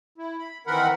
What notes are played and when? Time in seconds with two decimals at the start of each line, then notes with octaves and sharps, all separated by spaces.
0.18 E4
0.39 B5
0.67 D#3 E3 C4 A#4 F#5 B5